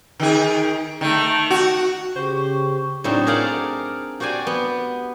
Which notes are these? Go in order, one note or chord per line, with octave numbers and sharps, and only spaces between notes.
D#3 G#4
D#3 A3
F#4
C#3 G4 C5 C#6
A2 F#3 C4 D4 D#4
G#4 A#4 C5 D5 F5 F#5
F#4 G4 C5 D5 G#5
B3